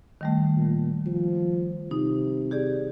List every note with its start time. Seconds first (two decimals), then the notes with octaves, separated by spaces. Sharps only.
0.21 D#3 G3 A3
0.57 A#2
1.06 F3
1.91 C3 D#4
2.51 G4 G#4 D5